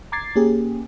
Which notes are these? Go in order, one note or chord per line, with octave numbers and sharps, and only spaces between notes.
A#5 D6 G#6 A6 C7
A#3 C#4 G4 G#4